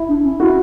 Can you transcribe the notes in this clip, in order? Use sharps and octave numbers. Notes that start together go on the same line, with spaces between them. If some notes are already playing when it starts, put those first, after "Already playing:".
Already playing: E4
D4
C#4
E4 F#4